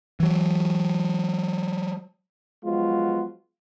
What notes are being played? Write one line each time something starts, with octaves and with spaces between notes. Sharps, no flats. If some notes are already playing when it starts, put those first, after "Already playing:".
E3 F#3
F3 F#3 G#3 B3 F4 F#4